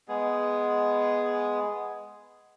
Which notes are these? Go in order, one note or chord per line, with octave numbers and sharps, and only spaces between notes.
G#3 B3 G#4